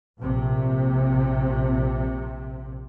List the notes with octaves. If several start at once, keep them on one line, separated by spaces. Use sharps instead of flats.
A#1 C3